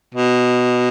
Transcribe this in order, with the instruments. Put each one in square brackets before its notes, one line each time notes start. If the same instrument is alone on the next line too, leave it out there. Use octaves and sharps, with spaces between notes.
[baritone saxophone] B2